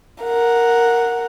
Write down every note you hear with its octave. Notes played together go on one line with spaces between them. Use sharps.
A#4 F#5